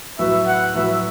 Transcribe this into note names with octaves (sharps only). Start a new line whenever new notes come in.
A2 F#3 B3 F#4 B4 E5
F#5
A2 F#3 B3 F#4 B4 E5